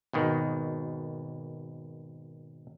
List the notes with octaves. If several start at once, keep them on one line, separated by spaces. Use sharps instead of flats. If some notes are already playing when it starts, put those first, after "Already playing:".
G#1 B2 D#3